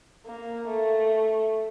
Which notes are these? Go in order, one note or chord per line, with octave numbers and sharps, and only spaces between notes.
A#3
A3